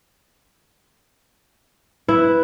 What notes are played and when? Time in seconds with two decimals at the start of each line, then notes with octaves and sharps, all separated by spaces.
2.09 E4 B4